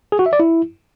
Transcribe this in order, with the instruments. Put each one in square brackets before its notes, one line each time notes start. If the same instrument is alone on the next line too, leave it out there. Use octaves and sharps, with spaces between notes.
[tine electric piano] G#4
F#4
E5
D5
E4